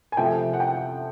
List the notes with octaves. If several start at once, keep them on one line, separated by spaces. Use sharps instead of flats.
G#5
C3 F3 A3 G5
F#5
G5